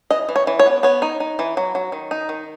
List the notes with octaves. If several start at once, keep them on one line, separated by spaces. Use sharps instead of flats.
E3 D#5
E3
C#5
E3
C#5
B3
B3 C#5
D#4
D#4
E3
F#3
F#3
D#3
D#4
D#3